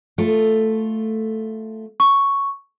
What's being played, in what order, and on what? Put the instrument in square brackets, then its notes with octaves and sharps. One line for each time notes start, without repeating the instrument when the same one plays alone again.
[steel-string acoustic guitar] A3 F4
[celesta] C#6